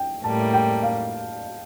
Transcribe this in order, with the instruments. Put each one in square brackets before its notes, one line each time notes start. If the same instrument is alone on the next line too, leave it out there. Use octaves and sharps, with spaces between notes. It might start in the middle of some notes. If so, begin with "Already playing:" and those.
Already playing: [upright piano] G5
[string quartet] A2 G3 A#3 [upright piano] A5
[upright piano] G5
F5